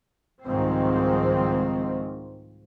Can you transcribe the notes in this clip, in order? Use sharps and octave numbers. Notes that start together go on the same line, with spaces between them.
C2 G#2 D#3 F3 C4